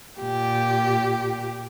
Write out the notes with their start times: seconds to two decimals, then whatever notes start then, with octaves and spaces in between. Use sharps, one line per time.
0.21 A#2 G4